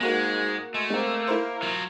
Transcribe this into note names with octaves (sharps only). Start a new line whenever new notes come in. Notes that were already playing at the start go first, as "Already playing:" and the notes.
G#2 G#3 A#3 F#4 A#4
G#3 A3
G#3 A#3 C4
E4 A#4 C5
F#3 F4